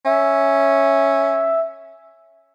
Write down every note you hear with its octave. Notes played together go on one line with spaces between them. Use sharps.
C#4 E5